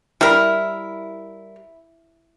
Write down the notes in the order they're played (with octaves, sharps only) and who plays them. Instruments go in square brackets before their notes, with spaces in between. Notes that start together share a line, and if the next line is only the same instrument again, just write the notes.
[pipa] G3 A#4 [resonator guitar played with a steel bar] E4